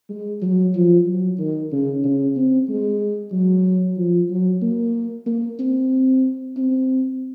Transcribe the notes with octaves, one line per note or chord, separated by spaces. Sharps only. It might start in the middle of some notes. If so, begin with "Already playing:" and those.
G#3
F#3
F3
F#3
D#3
C#3
C#3
C4
G#3
F#3
F3
F#3
A#3
A#3
C4
C4